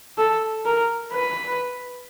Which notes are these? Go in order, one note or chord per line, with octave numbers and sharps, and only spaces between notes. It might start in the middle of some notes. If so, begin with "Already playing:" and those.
A4
A#4
B4